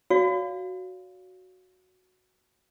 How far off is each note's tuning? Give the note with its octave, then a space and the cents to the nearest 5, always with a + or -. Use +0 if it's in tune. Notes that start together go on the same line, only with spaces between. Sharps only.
F#4 -5 C#5 +45 F5 +0